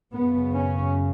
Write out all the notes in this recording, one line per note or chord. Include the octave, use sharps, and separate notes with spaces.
F#2 C#3 B3
C#4